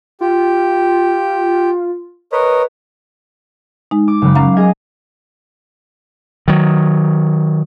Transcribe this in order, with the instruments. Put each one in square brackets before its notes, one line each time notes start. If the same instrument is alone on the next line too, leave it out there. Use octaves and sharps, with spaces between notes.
[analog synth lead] F4 [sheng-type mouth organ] G4
[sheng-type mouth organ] A#4 C#5 D#5 [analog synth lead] B4
[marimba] G#3 D#4
[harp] D6
F#1 F#3 B5
[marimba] F#3 C#4 A#5 [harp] F5
[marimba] F#3 [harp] G#4 D#5 F5
[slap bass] D#3 F#3